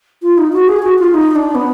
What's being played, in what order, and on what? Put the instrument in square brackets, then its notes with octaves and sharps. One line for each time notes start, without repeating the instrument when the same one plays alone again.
[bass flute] F4
D#4
F#4
G#4
F#4
F4
D#4
D4
B3